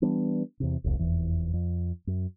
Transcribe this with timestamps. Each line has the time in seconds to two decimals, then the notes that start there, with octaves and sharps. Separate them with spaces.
0.02 E3 G3 B3 D4
0.60 E2 C3
0.84 E1 C2
0.99 F1 E2 E3
1.53 F2
2.07 F#2